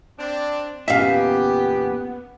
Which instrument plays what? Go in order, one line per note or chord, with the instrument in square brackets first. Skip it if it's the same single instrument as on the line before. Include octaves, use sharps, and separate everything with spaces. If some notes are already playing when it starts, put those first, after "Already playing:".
[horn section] C4 D4
[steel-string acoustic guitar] E2 A#2 C#3 [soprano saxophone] B3 [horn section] G4 [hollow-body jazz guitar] E5 F5